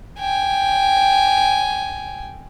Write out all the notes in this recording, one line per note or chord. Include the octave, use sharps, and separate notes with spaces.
G5 G#5